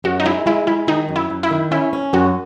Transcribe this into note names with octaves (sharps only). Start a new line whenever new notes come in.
F#2 F#4
D#4
G#3 E4
G#3 E4
G#3 E4
D#3 D#4
F#2
E4
F#2
E4
D#3
C#4 E4
C#4
F#2 F#4